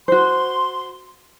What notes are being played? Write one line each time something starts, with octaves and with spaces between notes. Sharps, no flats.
F#4 C5 C6